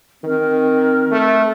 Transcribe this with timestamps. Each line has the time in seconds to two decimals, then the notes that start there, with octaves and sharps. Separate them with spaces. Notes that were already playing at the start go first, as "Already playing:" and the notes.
0.24 D#3 C4 A#4
1.12 A3